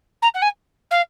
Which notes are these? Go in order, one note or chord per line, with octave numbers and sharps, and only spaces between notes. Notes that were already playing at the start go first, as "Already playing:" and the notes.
A#5
F#5
G#5
F5